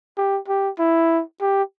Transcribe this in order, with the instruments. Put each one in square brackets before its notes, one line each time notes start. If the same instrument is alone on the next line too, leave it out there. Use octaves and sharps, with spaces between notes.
[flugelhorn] G4
G4
E4
G4